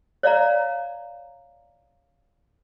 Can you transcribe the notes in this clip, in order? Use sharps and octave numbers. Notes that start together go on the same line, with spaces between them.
C#5 D5 F5 A#5